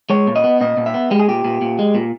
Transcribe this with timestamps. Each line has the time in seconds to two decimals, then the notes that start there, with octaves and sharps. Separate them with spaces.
0.10 G#3 C#5
0.27 A#2
0.36 D#5
0.44 B3
0.61 A#2 D#5
0.77 A#2
0.86 E5
0.94 B3
1.11 G#3 G4
1.20 G#4
1.28 A#2 G4
1.45 A#2
1.61 A#2
1.79 G#3
1.95 A#2